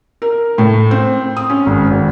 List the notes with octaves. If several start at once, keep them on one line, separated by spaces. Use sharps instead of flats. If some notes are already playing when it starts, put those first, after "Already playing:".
A#4
A2
C4
D#6
C#4
G#1
G#1